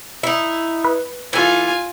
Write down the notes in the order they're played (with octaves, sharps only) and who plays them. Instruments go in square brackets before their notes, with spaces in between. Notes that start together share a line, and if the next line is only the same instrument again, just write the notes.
[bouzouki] D#4 E4
[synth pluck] B4
[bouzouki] E3 A4 [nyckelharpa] F4 G#5